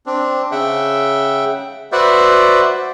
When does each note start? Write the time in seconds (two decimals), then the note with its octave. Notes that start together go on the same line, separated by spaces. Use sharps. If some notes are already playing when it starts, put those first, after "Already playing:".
0.06 C4 D4
0.52 C#3 E5 F#5 G5
1.92 F#4 B4 C5 D5 E5 F#5